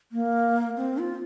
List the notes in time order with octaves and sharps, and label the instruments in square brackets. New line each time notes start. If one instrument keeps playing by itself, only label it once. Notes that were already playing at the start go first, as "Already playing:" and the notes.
[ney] A#3
C4
F4